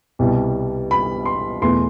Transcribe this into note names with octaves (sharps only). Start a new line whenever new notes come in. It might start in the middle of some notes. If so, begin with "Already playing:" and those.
C2 B2 G3
B5
C6
E2 B2 A3 C6